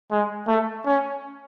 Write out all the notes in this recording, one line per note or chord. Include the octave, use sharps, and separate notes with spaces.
G#3
A3
C#4